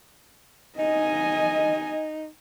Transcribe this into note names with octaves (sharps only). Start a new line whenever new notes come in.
D#4 D#5 G#5